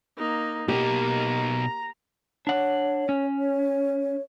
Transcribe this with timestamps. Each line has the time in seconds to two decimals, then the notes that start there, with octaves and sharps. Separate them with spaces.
0.18 A#3 D#4
0.68 B2 A#3 D#4 G4 A#5
2.47 D4 C#5 F#5
3.09 C#4
3.39 C#5